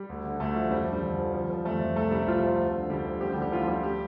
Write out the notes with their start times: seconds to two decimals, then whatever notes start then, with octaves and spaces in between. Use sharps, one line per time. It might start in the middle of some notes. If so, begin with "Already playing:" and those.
Already playing: G3
0.09 D2
0.24 D3
0.40 D2 A3
0.56 F3
0.71 F2 G3
0.87 D3
0.93 G3
1.03 F2
1.19 F3
1.33 F3
1.50 F3
1.64 F2 A3
1.80 F2
1.96 C2 A3 A4
2.11 C3 G3 G4
2.27 C2 F3 F4
2.43 F3
2.59 D2
2.75 D3
2.90 D2 G3 G4
3.06 F3
3.21 D2 G3 G4
3.32 G3 G4
3.36 D3
3.42 G3 G4
3.52 D2 F3 F4
3.63 F4
3.68 F3 G3 G4
3.83 G3 G4